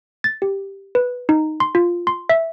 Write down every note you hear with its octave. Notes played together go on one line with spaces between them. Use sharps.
A6
G4
B4
D#4
C6
F4
C6
E5